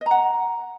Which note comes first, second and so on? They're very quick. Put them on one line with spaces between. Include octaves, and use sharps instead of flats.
D#5 A#5 F#5